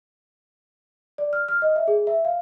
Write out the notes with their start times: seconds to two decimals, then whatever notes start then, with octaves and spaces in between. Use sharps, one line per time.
1.18 D5
1.33 F6
1.48 F6
1.62 D#5
1.76 E5
1.88 G#4
2.07 E5
2.25 F5